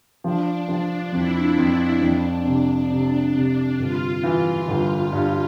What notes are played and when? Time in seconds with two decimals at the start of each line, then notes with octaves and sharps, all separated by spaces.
0.24 F3 D4
0.69 F3 D4
1.12 F2 E4
1.58 F2
2.02 F2 D4
2.45 C3
2.90 C3
3.35 C3
3.79 G1 F4
4.23 E3
4.68 G1
5.12 G2